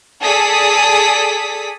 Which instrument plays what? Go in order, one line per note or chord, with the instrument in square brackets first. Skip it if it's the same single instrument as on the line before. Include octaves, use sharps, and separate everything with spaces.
[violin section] G#4 A4 D5 D#6 B6